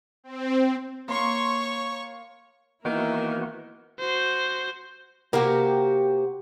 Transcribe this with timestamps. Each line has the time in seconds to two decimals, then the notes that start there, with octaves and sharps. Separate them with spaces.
0.24 C4
1.08 A#3 C#5 C6 C#6
2.85 D#3 E3 A#3 B3 E4 F#4 A#4 E5
3.99 F#4 C5
5.33 C3 A#3 F#4 G4 A#4